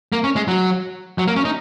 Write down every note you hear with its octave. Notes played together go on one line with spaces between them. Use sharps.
A#3
C#4
G#3
F#3
F#3
A#3
C#4
D#4